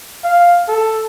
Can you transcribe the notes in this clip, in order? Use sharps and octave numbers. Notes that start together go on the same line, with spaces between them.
F5
A4